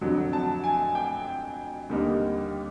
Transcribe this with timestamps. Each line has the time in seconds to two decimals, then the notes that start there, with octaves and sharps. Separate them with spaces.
0.01 F2 D3 F#3
0.33 A5
0.64 G#5
0.95 G5
1.89 D#2 D3 G3 A#3 D#4